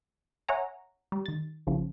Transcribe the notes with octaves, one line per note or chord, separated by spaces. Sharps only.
C#5 E5 F#5 G#5 A#5
G3
D#3 A6
A1 C#3 F3